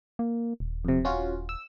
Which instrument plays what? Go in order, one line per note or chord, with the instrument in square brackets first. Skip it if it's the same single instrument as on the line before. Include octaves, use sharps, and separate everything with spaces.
[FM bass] A#3
D#1
[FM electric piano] F2 C3
C#4 F4 F#4
E6